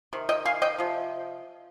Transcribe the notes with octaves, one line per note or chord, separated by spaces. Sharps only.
C3 D#3
D#5 G5
F5 G#5
D#5 G5
C3 F3